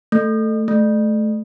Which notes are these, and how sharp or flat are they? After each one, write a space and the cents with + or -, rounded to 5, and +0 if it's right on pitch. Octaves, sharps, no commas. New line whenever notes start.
A3 +5
A3 -25